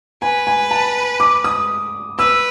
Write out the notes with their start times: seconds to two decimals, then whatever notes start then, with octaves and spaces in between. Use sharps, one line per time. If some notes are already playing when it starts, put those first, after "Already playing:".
0.22 B4 G#5
0.47 G#5
0.71 A5
1.20 D6
1.44 D#6
2.19 B4 E6